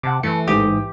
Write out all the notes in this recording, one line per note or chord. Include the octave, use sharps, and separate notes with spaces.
C3 F#5 A5 D6
E3 A3 B4 C#7
A1 G#2 G4 D#6